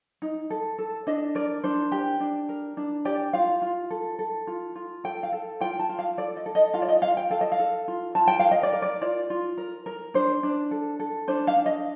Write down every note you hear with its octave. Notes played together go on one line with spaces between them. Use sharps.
D#4
A4
A4
D4 D#5
A#4 D5
D4 C5
G4
D4
A#4
D4
G4 D5
F4 F5
F4
A4
A4
F4
F4
A4 G5
F5
A4
F4 G5
A5
F4
F5
A4 D5
D#5
A4
D#5
F4 F5
D5
D#5
F4 F5
G5
A4 F5
D#5
F5
A4
F4
F4 A5
G5
F5
A#4
D#5
D5
A#4
D5
F4 D5
F4
A#4
A#4
D4 C5
D4
A4
A4
D4 C5
F5
D4
D#5